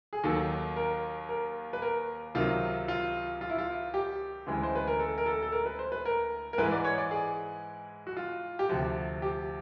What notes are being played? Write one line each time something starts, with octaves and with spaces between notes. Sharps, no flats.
G#4
D#2 D#3 F#3 A4
A#4
A#4
B4
A#4
C#2 C3 D#3 F#3 F4
F4
F4
E4
F4
G4
D2 C#3 E3 G#3
C5
B4
A#4
A4
A#4
A4
A4
A#4
B4
C5
B4
A#4
A#4
G#2 E3 G#3 B4
D5
C#5
D5
G#4
F#4
F4
G4
D2 C3 F3 F#4
G4